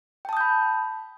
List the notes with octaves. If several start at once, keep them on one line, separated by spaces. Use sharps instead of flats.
G5 A5 B5 D#6 G6